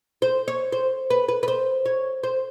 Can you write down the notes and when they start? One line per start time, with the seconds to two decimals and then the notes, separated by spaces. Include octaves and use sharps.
0.22 C5
0.48 C#5
0.72 C5
1.10 B4
1.29 B4
1.43 B4
1.48 C5
1.86 C#5
2.23 C5